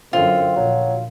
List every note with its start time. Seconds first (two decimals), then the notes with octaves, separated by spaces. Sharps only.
0.13 F#2 D3 C4 F4
0.56 A#1 F#3